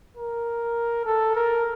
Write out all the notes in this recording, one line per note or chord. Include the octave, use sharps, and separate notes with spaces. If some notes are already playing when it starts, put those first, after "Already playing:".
A#4
A4
A#4